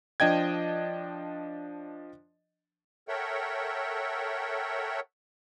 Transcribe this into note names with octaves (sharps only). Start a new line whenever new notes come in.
F3 D4 D#5 G5 G#6
A4 A#4 C#5 E5 F#5 G5